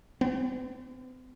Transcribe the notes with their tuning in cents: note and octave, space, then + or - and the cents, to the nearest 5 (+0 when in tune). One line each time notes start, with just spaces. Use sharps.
C4 -45